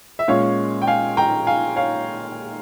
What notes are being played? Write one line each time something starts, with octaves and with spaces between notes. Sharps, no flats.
E5
A#2 G#3 C#4 C#5 F5
G5
F5 G#5
G5 A#5
F5 G#5
C#5 F5